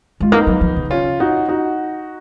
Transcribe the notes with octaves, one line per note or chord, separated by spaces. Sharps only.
G#3 F4
A#3 B3 D#4
F#3
F3
C#3
C#4 F4
D#4 F#4
D#4 F#4